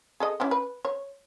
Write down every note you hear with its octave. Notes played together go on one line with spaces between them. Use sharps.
G#4 A4 D#5
C#4 E4 G4
B4
C#5